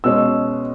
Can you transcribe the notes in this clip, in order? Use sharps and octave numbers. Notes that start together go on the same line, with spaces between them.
B2 G#3 C#4 E6